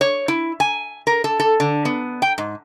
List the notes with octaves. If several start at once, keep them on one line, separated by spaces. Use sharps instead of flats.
C#5
E4
G#5
A#4
A4
A4
D3
B3
G5
G#2